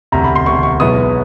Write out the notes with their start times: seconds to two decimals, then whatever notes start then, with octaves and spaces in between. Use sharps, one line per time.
0.12 E1 D2 C3 A#5
0.24 B5
0.35 C6
0.46 E1 D2 C3 C#6
0.63 C#6
0.80 B1 B2 G#3 B3 E4 D#6